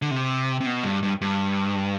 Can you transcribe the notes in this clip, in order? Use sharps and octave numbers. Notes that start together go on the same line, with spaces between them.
D3
C3
C3
B2
G2
G2
G2